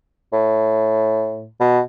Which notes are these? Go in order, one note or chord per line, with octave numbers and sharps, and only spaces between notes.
A2
B2